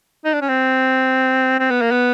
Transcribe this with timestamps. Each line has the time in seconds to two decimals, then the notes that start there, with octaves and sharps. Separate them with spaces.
0.25 D#4
0.33 D4
0.41 C#4
0.49 C4
1.59 C4
1.71 B3
1.81 A#3
1.91 B3